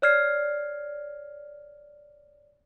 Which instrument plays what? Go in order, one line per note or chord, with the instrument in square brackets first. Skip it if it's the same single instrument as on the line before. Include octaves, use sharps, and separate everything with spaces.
[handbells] C#5 D5 F6 G#6 C7